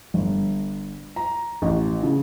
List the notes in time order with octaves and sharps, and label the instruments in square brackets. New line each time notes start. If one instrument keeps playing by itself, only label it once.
[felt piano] G1
A#5
A1
C#3